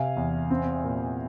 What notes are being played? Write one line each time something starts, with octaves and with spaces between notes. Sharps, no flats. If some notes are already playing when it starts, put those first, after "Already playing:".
Already playing: C3 F5 G#5
E2
C4
A#2